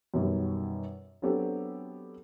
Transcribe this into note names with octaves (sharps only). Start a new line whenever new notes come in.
F#2 B2 D#3 G3
F#3 B3 C4 D4 G4 A4